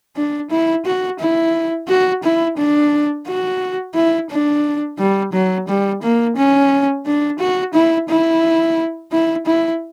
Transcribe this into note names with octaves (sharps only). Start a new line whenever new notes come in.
D4
E4
F#4
E4
F#4
E4
D4
F#4
E4
D4
G3
F#3
G3
A#3
C#4
D4
F#4
E4
E4
E4
E4